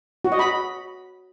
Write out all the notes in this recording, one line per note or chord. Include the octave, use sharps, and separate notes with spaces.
F#4
D#5
B5